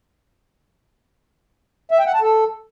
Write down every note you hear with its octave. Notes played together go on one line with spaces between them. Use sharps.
E5
G5
F#5
A5
A4